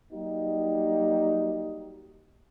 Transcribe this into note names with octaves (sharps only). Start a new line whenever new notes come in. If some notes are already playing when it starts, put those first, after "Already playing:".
F#3 G3 A#3 D#4 G4